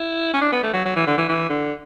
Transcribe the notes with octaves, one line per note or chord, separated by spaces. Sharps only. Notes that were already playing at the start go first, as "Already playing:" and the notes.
Already playing: E4
C#4
D4
B3
A3
F#3
F#3
E3
D3
E3
E3
D3